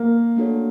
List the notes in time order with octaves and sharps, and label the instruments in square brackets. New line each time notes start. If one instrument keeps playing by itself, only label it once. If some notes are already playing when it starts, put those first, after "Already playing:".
Already playing: [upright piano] A#3
[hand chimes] A3 D4 F#4 A4 C#5